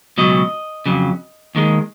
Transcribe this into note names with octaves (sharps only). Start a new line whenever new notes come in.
C#2 B2 F#3 D#5
F2 C#3 F#3
D#2 D#3 G#3